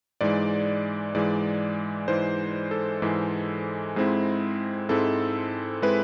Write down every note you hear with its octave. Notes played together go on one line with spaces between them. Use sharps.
G#2 E3 G#3 D5
G#2 E3 G#3 D5
G#2 E3 G#3 C5
A4
G#2 E3 G#3
G#2 G#3 C4 E4
G#2 G#3 C4 E4 A4
G#3 C4 E4 B4